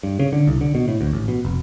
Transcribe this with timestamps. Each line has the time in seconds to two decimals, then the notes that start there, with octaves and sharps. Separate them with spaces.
0.03 G2
0.19 C#3
0.33 D3
0.47 C2
0.61 D3
0.75 B2
0.88 A2
1.01 D2
1.13 A1
1.28 B2
1.45 F1